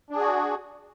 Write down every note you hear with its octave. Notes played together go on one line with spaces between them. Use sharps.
D4 F#4 G#4